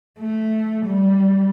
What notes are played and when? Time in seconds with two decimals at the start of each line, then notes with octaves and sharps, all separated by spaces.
0.20 A3
0.86 G3